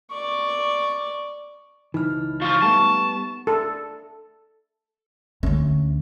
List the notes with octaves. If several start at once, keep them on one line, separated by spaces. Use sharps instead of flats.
D5 C#6
C#2 E3 D#4 F6
F3 F4 C#6
G3 A3 B3 A5
A4
D2 C#4